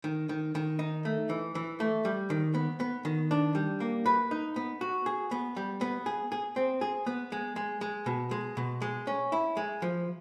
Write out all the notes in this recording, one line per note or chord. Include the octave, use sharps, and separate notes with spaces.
D#3
D#3
D#3
D#4
A3
E3
E3
A3
G3
D#3
B3
B3
D#3
D4
G3
A#3
B4
D#4
B3
F#4
G#4
B3
G3
B3
G#4
G#4
C4
G#4
B3
G#3
G#3
G#3
B2
G#3
B2
G#3
C#4
E4
G#3
F3